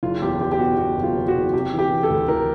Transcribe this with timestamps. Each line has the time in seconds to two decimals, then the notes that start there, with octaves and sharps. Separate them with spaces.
0.03 F#1 F4
0.22 E2 G4
0.41 F#1 G4
0.52 G4
0.59 B2 F#4
0.78 B2 F#4
0.97 F#1
1.03 F4
1.15 E2
1.28 F#4
1.34 F#1
1.54 C3 G4
1.73 E3
1.79 G4
1.91 E3
2.03 A4
2.10 D2
2.28 E3 A#4